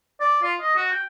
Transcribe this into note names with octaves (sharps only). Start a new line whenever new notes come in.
D5
F4
D#5
F#4
G5